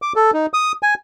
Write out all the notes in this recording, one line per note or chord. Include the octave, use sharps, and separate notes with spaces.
D6
A4
D#4
D#6
G#5